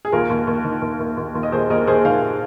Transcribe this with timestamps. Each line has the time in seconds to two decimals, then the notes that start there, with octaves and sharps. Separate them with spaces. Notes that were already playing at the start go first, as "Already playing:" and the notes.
0.05 G#4
0.12 D#2 F4 A#4
0.30 D#2
0.47 D#2
0.64 D#3
0.82 D#2
1.00 D#2
1.17 D#2
1.35 D#2
1.43 D#5
1.52 D#2 G#4 C5
1.70 D#2 A#4 D#5
1.87 D#2 G#4 C5
2.05 D#3 C5 F5